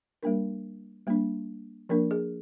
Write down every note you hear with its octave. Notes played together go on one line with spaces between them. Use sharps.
G3 A#3 D4 A#4
G3 A#3 D4
F3 A#3 D4 A#4
G#4